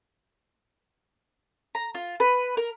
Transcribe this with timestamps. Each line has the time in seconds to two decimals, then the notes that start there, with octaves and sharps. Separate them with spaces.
1.75 A#5
1.95 F4
2.20 B4
2.57 A#4